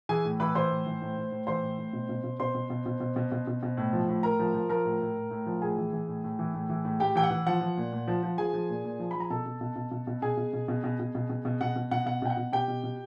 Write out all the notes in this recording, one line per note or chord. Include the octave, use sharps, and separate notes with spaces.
E3 G#4 G#5
A2
E3 B4 B5
E3 C5 C6
A2
E3
A2
A2
A2
E3 C5 C6
A2
A2
B2
B2
B2
B2 C5 C6
B2
B2
B2
B2
B2
B2
B2
B2
A2
F3
A2
A2 A#4 A#5
F3
F3
F3 A#4 A#5
A2
A2
A2
A2
F3
A2 G#4 G#5
E3
E3
A2
A2
E3
A2
E3
A2
A2 G4 G5
E3 G5
F#5
E3
F3 F#5
F3
A#2
A#2
F3
F3
F3 G#4 G#5
F3
A#2
A#2
F3
F3 B5
A#5
B2 A4 A5
B2
B2
B2
B2
B2
B2 G#4 G#5
B2
B2
B2
B2
B2
B2
B2
B2
B2 F#5
B2
B2 F#5
B2 F#5
B2 G5
F#5
B2
B2 G4 G5
B2
B2